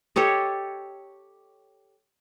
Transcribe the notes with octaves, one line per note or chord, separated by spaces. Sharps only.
G4 A4 C#5 D#5